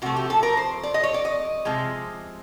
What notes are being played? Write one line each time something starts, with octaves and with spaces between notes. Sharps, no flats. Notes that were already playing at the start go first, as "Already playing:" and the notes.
C3 F3 A3 F#4
G4
A4
A#4
C5
D5
D#5
C#5
D5
D#5
C3 F3 G#3